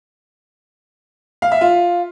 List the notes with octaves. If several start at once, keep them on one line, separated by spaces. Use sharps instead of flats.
F5
E5
F4